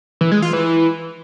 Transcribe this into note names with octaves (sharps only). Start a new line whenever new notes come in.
E3
G#3
F4
E3